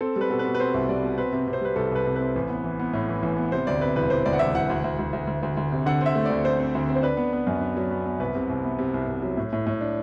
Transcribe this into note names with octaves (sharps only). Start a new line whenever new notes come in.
C4 A4
G3 B4
B2 A4
B4
B2
B4
C4 C5
C2
G3 D5
B2
C4 B4
C3
C3
C5
G3 B4
C2 A4
C2 B4
C3
C4 B4
A1
B3
E3
B3
A2
E3
A1
B3
C3 C5
D2 D5
C3 B4
E1 B4
E1 C5
D2 D5
F#5
E1 E5
E1 F#5
D2
D2
D2
D2
D2
D2
D2
C3
D3 F#5
C4
E5
A3
D2 D5
A3 C5
C4
D2
C4
C5
D4 B4
B3
B3
F#2
D4
F#3
B3
B3
C2 B4
C3
C2
B3
C3
C2
C3
F#3
A2
A2
A2
D4